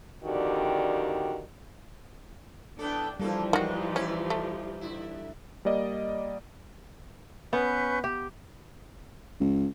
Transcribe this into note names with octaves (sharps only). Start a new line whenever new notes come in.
F2 D3 D#3 F#4 G4 D5
E3 B3 D4 A4 G5
E3 F3 G3 A#3 G4 A4
D#3 G#3 D#4 F#4
C#4 E4 D5
A3
D3 E4
G3 A#3 D5 D#5
B3 C#4 B4 C#6 G6
G4
C#2